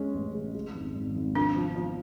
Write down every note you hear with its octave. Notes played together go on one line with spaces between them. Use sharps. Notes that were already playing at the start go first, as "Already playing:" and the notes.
Already playing: G#3 C#4
A1
G#3
G#3
G#1
G#1
G#1
F3 D4
F3
F3